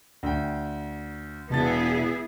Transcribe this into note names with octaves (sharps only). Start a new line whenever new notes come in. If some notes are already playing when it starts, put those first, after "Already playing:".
D2 G5
E1 B3 E4 G#4 A5 A6